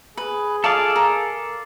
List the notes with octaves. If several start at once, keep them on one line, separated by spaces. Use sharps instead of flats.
G#4 B4
F4 A4 D5 D#5 F5 A5
A#4